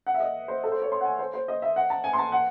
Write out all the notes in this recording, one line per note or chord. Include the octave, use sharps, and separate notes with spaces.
F#5
E5
D#5
C5
A4
C5
C#5
C6
F#5
G#5
C5
C5
D#5
E5
F#5
A5
G#5
C6
A5
F#5